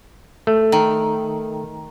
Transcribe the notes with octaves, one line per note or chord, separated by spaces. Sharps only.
A3
D#3